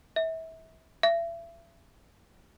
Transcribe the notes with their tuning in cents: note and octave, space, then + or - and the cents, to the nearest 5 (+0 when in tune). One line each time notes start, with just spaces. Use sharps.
E5 -30
E5 +35